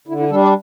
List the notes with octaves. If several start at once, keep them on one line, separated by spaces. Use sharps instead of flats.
D3 E4
E4
G3 D4 A4
D5